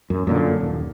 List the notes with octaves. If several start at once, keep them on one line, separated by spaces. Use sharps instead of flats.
F#2
F#2 A#2 D3
D#1